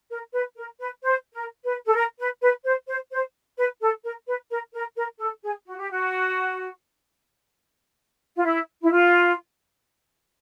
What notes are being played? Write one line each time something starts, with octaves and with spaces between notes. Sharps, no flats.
A#4
B4
A#4
B4
C5
A#4
B4
A4
A#4
B4
B4
C5
C5
C5
B4
A4
A#4
B4
A#4
A#4
A#4
A4
G#4
F#4
G4
F#4
F4
E4
E4
F4